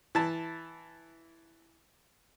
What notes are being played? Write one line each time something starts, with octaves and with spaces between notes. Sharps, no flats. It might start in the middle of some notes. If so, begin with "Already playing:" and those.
E3 A5